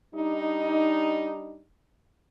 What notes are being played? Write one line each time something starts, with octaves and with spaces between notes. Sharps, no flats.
G3 D4 D#4